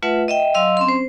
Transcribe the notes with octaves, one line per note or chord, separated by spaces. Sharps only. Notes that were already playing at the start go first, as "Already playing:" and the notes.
A3 F4 B4 E5 F#5
D#5 E5 G5
F#3 D#5 F5 C6 E6
C4 C#4 C6
C5